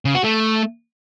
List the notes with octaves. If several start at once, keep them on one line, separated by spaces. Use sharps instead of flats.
C#3
F#4
A3